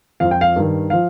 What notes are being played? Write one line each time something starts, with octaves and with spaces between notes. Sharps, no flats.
F2 F3 F5
G5
F5
G2 D#3
F3 F5